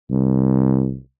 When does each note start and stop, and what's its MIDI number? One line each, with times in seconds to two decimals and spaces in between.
0.10 0.96 36